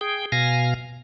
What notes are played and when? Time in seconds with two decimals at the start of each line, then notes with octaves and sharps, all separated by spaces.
0.01 G#4 G5
0.32 B2 F5 G#5 A#6